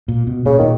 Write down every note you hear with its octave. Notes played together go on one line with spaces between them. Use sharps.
A#2
B2
A#2 C#3
A#2 D#3